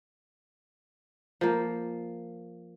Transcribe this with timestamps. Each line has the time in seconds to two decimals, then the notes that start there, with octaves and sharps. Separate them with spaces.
1.41 F3 A#3